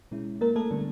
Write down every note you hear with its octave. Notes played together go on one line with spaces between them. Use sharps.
B2 G#3 C#4 E4
A#3 A#4
A3 A4
D3 G3 B3 D4